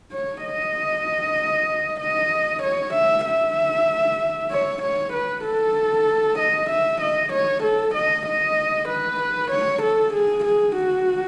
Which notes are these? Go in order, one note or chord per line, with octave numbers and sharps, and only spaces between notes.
C#5
D#5
D#5
C#5
E5
E5
C#5
C#5
B4
A4
D#5
E5
D#5
C#5
A4
D#5
D#5
B4
C#5
A4
G#4
G#4
F#4